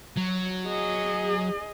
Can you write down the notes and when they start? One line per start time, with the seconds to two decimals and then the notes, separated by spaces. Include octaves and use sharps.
0.17 F#3
0.67 G#4 D#5